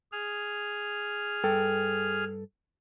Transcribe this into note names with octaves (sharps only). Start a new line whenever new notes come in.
G#4 F6
G2 A4 G5